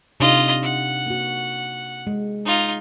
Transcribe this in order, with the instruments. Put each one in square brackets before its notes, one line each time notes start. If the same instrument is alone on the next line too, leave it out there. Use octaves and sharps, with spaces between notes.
[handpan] C3 D4 D#4 [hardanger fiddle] F4 D#5
[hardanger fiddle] F#5
[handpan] A#3 F#4
G#3
[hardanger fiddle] D#4 F4